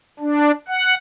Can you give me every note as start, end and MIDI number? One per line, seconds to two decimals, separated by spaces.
0.20 0.51 62
0.68 0.95 78